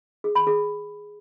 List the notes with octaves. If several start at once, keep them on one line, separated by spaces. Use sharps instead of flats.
G#4
B5
G#4